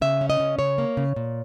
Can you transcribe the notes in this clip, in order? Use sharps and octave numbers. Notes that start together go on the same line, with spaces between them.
C#3 E5
C#4
D#5
C#3
C#3 C#5
A#3
C#3
A#2